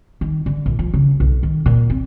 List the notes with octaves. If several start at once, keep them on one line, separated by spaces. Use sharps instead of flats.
D#3
D3
A#1
F3
C#3
B1
D#3
A#2
C4